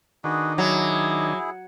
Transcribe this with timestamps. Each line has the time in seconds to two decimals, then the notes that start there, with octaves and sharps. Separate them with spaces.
0.24 D#3 D4 D#4 F#4 G#4 B4
0.58 F#3 E4 G#4